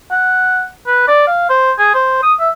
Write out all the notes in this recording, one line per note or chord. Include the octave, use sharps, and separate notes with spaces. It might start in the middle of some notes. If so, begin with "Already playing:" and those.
F#5
B4
D5
F5
C5
G#4
C5
D#6
E5